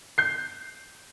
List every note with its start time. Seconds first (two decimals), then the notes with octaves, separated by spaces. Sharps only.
0.18 G6 C7